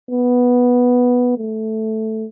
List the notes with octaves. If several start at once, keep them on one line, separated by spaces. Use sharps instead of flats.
B3
A3